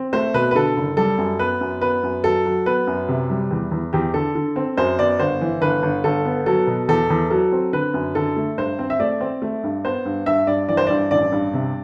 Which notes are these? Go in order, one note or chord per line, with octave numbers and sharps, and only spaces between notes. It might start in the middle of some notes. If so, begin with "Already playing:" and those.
Already playing: C4
A3 C5
B2 B4
B4
D3 A4
F#1
G3 A4
F#2
B3 B4
F#2
B3 B4
F#2
F#3 A4
F#3
B3 B4
F#2
C3
G3
E2
E2
E2 G4
D3 A4
D3
C4
F#2 C5
B3 D5
G1 C5
E3
G1 B4
G1
G1 A4
B3
F#3 A4
B2
E2 A4
E2
F#3 A4
C4
D3 B4
F#2
D3 A4
A3
G2 C5
C4
E5
A3 D5
C4
A3
G2
B3 C5
G2
G2 E5
G2 D5
E3 D5
C5
G2 D5
A1 D5
G2
C3